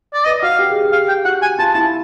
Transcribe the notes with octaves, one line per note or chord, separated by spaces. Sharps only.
D5
B4 D#5
F#4 F5
G4
G#4
G4
F5
G5
F#4 F#5
G#5
F4 A5
E4 A5